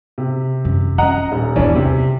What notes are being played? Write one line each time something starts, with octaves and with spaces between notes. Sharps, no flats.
C3
F#2
C#4 F4 D#5 F#5 A#5
D#1
E2 E3 B3 C#4 D4
C3